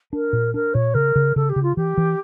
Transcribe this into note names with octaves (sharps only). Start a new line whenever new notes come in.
D4 A#4
A#2
D4 A#4
A#2 C#5
C#3 A#4
C#3
C#3 A4
G4
C#3
F4
E3 G4
E3